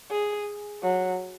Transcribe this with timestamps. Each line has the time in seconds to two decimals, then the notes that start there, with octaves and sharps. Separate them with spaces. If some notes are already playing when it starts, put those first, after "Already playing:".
0.11 G#4
0.83 F#3